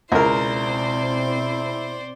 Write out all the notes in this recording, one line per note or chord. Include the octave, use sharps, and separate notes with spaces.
C#2 B2 C4 E4 A#4 C5 D5